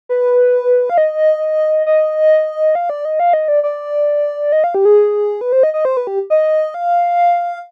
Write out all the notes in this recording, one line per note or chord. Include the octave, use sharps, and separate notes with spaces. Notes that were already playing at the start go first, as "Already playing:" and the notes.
B4
F5
D#5
D#5
F5
D5
D#5
F5
D#5
D5
D5
D#5
F5
G4
G#4
B4
C5
D#5
D#5
C5
B4
G4
D#5
F5